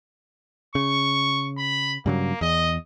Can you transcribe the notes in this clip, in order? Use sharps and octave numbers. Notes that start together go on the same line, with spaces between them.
C#3 C#6
B5
G2 C#3 F#3 A#3
E2 D#5